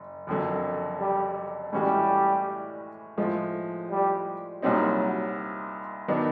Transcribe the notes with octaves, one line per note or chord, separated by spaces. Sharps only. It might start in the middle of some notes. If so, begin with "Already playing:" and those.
Already playing: F#1
F#1 F2 D3 F#3
G3
A2 E3 G3 G#3 C#4 F#4
A2 F3 G#3
G3
C2 A#2 F#3 G3 C4 D#4
D#3 F#3 B3 D4